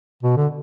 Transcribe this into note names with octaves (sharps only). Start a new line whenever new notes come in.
B2
D3